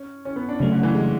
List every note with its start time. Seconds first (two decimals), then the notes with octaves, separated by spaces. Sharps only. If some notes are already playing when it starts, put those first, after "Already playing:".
Already playing: C#4
0.25 C#4
0.36 B3
0.49 D4
0.59 C#3 F#3 A3 C#4
0.72 D3
0.83 E3
0.95 G#3